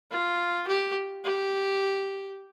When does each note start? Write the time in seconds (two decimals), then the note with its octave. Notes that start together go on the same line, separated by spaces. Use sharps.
0.11 F4
0.68 G4
1.25 G4